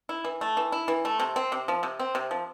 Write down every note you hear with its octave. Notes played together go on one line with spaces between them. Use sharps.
E4
E3
A3
E3
E4
E3
A3
C3
C4
C3
F3
C3
C4
C3
F3